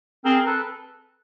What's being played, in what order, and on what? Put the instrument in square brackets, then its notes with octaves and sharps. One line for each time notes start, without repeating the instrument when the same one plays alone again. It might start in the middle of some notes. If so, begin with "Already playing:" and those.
[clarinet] C4 [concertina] G#4 A#4
[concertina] A#4
A4 B4